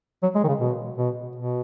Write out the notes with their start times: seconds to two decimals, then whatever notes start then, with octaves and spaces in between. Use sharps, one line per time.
0.23 F#3
0.35 G#3
0.44 D#3
0.48 C#3
0.60 B2
0.98 B2
1.36 B2